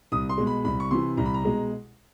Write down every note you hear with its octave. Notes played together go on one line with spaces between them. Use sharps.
C2 D#6
C6
B2 G#3
B5
C2 B5
C#6
C3 E3 C6
C2 A#5
B5
A#5
B2 G#3